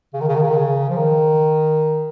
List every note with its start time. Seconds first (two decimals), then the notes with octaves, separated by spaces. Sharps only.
0.14 C#3
0.21 D#3
0.28 C#3
0.36 D#3
0.43 C#3
0.50 D#3
0.56 C#3
0.90 F3
0.97 D#3